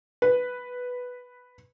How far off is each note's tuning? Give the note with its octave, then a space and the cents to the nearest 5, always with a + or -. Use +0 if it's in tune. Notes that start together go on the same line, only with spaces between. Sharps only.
B4 +0